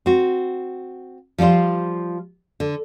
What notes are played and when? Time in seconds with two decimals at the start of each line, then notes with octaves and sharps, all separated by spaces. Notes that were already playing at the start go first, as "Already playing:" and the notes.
0.06 C4 F#4
1.38 F3 G3 E4 F4 C5
2.60 D3